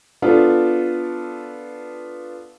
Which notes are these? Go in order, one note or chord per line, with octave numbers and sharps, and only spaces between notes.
B3 D4 F4 A4